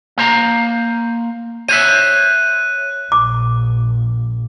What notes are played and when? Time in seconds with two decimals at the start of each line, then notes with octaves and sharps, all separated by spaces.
0.18 A#3 C5 A#5
1.69 C5 C#5 E5 F#6 D#7
3.12 A#1 D6